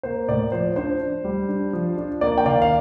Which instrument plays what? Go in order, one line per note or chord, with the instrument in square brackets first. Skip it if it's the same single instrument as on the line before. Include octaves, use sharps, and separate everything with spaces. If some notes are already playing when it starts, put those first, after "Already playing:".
[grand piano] A#3 C5
A2 D5
F3 C5
D4 C5
D4
G3
D4
F3
D4
A#3 D5
G5
D#3 D5 F5
F5